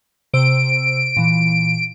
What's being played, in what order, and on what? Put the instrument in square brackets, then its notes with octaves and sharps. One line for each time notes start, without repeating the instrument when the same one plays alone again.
[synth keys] C3 C5 E6 [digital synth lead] D7
[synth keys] A#2 E3